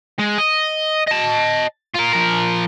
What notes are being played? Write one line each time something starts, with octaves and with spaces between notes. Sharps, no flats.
G#3
D#5
D#5 A5
F4 A#4
F3 A#4